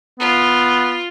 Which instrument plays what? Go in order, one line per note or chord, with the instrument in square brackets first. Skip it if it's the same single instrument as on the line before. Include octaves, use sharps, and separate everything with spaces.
[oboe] B3 [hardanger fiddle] F4